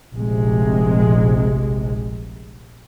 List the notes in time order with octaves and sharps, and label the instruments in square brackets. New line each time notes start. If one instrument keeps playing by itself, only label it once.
[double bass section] F1 A#1 C3 G#3